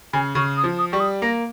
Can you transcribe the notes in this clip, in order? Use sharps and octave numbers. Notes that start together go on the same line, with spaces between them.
C#3 G#5
C#3 C#6
D#6
F3
D#6
G3 C#6
D#6
A#3 A#6